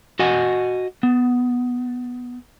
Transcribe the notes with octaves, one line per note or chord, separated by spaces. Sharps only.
F#4 D#5 F#5 G#5
B3